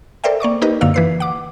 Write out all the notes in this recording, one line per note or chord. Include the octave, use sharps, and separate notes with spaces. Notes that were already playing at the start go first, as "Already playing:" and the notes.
A4 A#4 C5 D5 E5 G5
A#3 D5 C#6 D6
A#3 D#4 G4 A#4 B4 D#5
F#2 D3 A#3 F5 E6
E3 B4 C7
F#5 D6